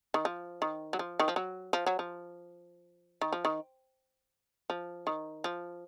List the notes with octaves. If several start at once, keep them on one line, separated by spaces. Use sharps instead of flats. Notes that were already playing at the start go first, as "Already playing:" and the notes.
D#3
F3
D#3
F#3
F3
D#3
F3
F#3
F3
F#3
F3
D#3
F3
D#3
F3
D#3
F3